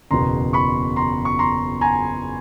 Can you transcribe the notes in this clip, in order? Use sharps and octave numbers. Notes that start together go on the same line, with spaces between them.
F#1 E2 B2 A#5 C6
B5 C#6
A#5 C6
C#6
A#5 C6
G#5 A#5